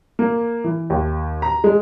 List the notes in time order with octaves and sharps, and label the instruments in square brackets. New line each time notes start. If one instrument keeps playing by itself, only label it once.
[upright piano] A#3
E3
D#2
A#5
G#3